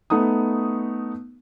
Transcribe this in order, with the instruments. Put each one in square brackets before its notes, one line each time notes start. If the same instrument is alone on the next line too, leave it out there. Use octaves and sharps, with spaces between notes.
[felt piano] A3 B3 D#4 D#6